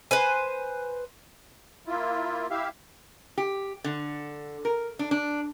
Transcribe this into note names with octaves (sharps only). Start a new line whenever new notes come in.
B4 C5 G#5
A#3 E4 F4
E4 G4 E5 F5
G4
D3
A#4
D4
D4